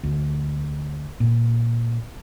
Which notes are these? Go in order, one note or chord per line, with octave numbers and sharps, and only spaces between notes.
D2
A#2